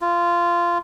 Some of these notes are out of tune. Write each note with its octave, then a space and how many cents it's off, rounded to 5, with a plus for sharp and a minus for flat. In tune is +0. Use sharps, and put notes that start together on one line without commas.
F4 -15